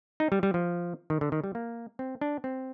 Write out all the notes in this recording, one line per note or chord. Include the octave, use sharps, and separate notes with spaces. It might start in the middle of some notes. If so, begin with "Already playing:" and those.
D#4
G3
G3
F3
D#3
D3
D#3
G3
A#3
C4
D4
C4